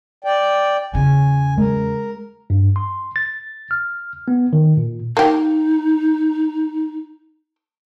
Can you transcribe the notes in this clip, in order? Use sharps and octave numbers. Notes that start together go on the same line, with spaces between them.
D5 G5
E2 C#3 G#5
G#3 A#4
G2
C6
A6
F6
B3
D#3
A#2
A#3 D#4 G4